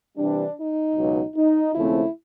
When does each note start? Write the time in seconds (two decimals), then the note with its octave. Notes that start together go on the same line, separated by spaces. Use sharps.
0.18 C3 E3 G3 D4
0.58 D#4
0.96 C#2 B2 F#3
1.36 D#4
1.74 D#2 C#3 F3 A3 C4 E4